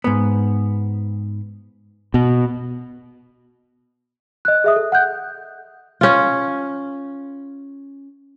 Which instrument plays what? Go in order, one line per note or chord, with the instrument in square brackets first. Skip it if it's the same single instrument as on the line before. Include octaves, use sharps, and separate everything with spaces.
[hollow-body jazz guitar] G#2 B3
[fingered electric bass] B2
[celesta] D#5 F#6
G#4 E5 D#6
A4
F#5 F#6 G6
[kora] C#4 F4